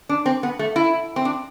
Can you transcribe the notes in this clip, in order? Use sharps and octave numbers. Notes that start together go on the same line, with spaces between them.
D4
C4
B3
A3
E4
C4
D4